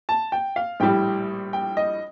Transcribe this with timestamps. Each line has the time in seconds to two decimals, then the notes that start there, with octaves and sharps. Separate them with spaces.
0.09 A5
0.32 G5
0.56 F5
0.80 A#1 A2 G3 G5
1.53 G5
1.77 D#5